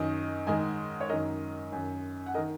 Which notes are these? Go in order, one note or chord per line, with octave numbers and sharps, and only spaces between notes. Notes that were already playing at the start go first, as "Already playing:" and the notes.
Already playing: F#2 D#3 D#5
G#2 D#3 D#5 G#5
C#5
F#2 D#3 A#4 D#5
F#2 D#3
F#5
A#4 D#5
D#3